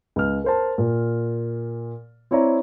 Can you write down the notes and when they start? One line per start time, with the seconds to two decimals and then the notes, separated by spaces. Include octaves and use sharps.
0.16 C#2 F6
0.44 A#4 C5 A5
0.78 A#2
2.31 C4 E4 C#5 D5 A#5